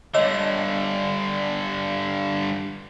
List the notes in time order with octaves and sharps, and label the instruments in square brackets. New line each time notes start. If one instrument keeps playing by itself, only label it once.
[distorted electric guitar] G2 D3 [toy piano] C#5 D#5 E6